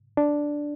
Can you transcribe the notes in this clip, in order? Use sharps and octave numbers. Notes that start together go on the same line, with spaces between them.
D4